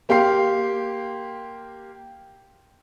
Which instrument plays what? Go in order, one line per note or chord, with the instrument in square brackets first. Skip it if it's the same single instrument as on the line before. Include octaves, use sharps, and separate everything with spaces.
[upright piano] A#3 G4 F5 C6 C7